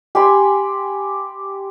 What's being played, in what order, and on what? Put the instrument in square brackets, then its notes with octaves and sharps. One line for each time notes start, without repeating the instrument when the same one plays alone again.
[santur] G4 G#5 B5 C6